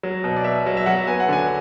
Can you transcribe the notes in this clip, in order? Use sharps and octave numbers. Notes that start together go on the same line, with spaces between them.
F#3
B2
D5
B2 E5
F#3
E5
F#3 F#5
B3 G#5
F#5
D3 G#5